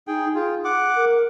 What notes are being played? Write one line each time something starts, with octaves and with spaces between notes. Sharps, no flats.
D#4 G#4 G5
F4 G#4
F#5 D6
A#4